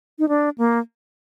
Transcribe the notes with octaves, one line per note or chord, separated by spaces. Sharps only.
D#4
D4
A#3